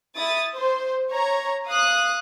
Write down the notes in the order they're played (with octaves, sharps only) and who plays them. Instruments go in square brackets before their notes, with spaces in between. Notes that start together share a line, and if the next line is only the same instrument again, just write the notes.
[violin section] E4 D#6 A6
C5
C#5 A#5
F5 D#6 F#6